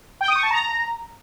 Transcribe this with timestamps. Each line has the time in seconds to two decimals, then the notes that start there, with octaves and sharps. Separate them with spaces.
0.21 G5
0.28 D#6
0.36 C#6
0.43 A5
0.50 A#5